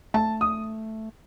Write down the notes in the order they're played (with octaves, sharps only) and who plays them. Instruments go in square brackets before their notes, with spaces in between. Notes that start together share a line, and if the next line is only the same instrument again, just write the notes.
[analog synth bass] A3 [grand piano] A5
[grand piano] D#6